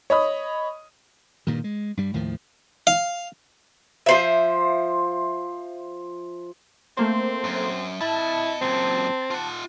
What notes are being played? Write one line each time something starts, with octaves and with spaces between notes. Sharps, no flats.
C#5 D#5 B5 D#6
G2 A#2 D#3
G#3
G2 G3
D#2 A2 D#3 F3
F5
F3 C5 E5
A3 A#3 C4 C5
F#2
E4 D#5 A5 B5
F#2 A#2 C4
F4 F#5